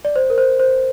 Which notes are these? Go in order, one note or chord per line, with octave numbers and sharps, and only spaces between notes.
D5
C5
A#4
C5
C5